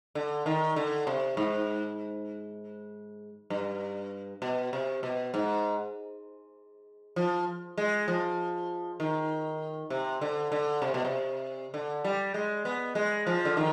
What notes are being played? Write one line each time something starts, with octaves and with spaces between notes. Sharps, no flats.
D3
D#3
D3
C3
G#2
G2
B2
C3
B2
G#2
F3
G#3
F3
D#3
C3
D3
D3
C3
B2
C3
D3
G3
G#3
B3
G#3
F3
D3
D#3